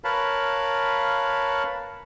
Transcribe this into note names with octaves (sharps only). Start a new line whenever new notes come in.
A#4 B4 C#5 F5 A5 B5